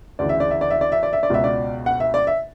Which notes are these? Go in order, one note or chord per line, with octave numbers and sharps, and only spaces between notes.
D2 C#3 E3 D5
E5
D5
E5
D5
E5
D5
E5
D5
E5
D5
C#2 B2 E5
D5
F#5
E5
D5
E5